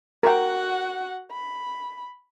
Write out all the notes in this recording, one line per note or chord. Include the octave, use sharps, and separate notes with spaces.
F#4 A#4 F#5 G5
B5